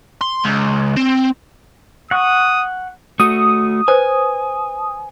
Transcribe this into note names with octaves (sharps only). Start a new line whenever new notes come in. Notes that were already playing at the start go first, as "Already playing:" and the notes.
C6
C#2
C4
F#5 C#6 D#6
A3 F#4 D#6
B4 C5 G#5